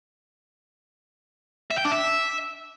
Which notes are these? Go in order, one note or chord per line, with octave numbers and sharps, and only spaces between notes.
E5
G5
D4
E5